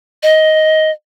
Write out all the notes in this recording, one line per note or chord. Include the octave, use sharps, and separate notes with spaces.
D#5